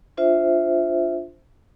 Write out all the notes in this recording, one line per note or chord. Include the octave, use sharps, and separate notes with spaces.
D4 F4 C5 E5